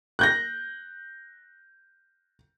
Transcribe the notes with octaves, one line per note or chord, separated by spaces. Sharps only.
F#6 G6 A#6